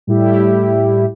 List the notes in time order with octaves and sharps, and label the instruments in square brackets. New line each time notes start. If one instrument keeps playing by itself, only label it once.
[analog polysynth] A2 G3 E4 G4